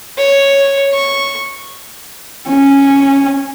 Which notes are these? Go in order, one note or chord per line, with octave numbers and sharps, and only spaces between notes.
C#5
C#6
C#4